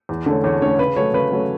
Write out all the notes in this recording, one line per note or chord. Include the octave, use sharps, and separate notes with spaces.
E2
D3 A3 C#4
E2 C#5
D3 A3 C#4 C#5
C#3 B4
F#3 A3 C#4 C#5
C#3 B4
F#3 A3 C#4